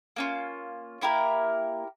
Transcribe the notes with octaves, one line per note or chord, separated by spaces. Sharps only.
A#3 C#4 F4
A#3 E4 G4 A#4